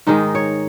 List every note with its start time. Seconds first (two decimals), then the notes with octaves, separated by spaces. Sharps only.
0.07 G#2 D#3 G#3 D#4
0.35 C#5